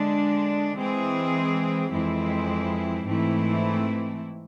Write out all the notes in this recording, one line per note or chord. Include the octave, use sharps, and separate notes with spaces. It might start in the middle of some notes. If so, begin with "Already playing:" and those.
Already playing: D3 G#3 D4
E3 G#3 C4 G#4
F2 E3 G#3 C4 E4
G#2 E3 A3 C4 E4